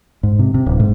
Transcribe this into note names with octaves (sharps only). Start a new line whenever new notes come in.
G#2
C3
C3
D1
G#2